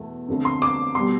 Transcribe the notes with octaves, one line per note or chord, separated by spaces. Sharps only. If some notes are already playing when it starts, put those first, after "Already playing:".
Already playing: E2 B2 A3
F2 D3 A3
C6
D6
B2 G3 C6